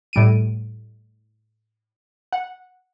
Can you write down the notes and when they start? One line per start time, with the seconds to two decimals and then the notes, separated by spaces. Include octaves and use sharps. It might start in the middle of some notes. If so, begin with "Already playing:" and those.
0.13 A2 G3 D7 D#7
2.32 F#5